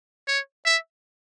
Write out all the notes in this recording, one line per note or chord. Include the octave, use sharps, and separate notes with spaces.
C#5
E5